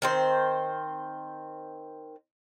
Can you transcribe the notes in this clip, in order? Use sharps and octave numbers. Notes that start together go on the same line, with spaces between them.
D#3 C4 C5